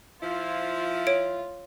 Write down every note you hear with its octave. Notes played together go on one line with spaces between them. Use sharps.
F3 E4 F4
C#5 D7